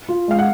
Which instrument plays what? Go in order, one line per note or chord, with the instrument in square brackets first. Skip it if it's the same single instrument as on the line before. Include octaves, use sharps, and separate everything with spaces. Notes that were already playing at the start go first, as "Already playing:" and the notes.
[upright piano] F4
[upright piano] G#3 [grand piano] F5
[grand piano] F#5